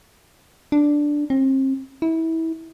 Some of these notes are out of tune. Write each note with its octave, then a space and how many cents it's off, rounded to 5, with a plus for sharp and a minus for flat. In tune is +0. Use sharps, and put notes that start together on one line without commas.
D4 +0
C4 +35
E4 -25